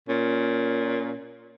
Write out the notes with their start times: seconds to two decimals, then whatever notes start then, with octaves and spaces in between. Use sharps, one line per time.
0.08 A#2 C#4